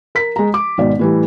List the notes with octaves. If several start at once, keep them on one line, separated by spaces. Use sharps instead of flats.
A#4 B6
G#3 A#5
D6
G#1 B2 D5
A2 E3 G3